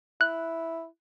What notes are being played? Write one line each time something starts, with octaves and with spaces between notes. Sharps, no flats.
E4 F#6